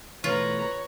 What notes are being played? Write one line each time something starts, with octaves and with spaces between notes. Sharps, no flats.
B2 E3 A3 F4 B4 C#5 A#5